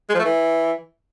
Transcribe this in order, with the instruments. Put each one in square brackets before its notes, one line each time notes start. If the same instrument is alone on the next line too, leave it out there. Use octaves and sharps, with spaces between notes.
[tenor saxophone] G#3
F3
A3
E3